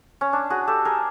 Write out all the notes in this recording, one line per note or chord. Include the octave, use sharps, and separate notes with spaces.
C#4
D4
F#4 G#4
G4 A4
G#4 A#4